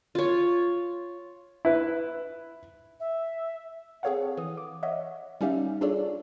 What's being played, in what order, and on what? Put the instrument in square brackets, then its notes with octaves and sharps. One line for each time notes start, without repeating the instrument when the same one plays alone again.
[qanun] F4 C#5
[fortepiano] E4 B4
[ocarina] E5
[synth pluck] C4 G#4 A4 C#5 F5 F#5
E3 D#6
D6
C#5 D#5 E5 F#5
G3 C#4 D#4 G4 E5 F5
D4 F4 G#4 A4 C#5 D5